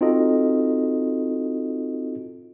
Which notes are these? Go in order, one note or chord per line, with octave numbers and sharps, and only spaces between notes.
C4 D#4 F4 F#4 A4 D#5